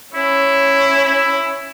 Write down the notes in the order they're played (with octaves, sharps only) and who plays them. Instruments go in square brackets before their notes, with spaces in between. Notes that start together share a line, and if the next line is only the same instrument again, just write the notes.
[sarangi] C#4 [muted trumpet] E4
[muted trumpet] E4